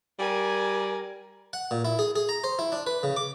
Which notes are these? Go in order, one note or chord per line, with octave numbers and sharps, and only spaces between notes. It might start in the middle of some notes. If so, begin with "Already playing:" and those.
G3 A#4 G#5
F#5
A#2
E4
G#4
G#4
A#5
C5
E4
D4
B4
C#3
D6